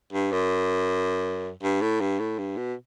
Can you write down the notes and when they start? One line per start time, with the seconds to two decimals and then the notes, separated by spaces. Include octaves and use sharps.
0.13 G2
0.32 F#2
1.63 G2
1.81 A2
2.00 G2
2.20 A2
2.38 G2
2.57 B2